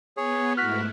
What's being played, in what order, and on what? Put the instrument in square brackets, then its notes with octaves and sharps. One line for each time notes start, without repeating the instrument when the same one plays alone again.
[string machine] B3 [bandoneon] G#4 C#5
[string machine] G#2 A3 E4 [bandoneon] F#4 [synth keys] F6 F#6 B6